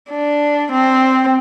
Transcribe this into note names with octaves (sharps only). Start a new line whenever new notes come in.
D4
C4